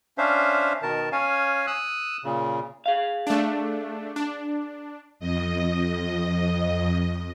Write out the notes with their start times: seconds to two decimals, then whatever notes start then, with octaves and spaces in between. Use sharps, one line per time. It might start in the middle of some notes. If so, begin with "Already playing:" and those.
0.18 C#4 D4 C5 E5 F5
0.82 B2 D#3 A#4 A5
1.12 C#4 C#5 F5 G#5
1.67 D#6 E6 F#6
2.24 A#2 C#3
2.86 G#4 F5
3.27 A3 D4
4.16 D4
5.19 F2 D#5